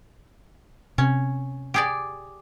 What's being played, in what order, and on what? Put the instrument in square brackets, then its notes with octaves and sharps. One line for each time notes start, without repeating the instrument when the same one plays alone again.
[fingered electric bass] C3 [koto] C#4
[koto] G4 G#4 D5